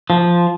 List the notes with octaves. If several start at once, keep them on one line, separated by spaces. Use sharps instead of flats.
F3